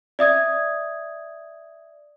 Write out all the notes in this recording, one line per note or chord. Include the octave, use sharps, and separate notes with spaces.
D5 E5 D#6 G#6